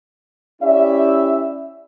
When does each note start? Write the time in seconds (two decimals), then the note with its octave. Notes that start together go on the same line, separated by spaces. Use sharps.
0.62 C#4 E4 G4 D5 E5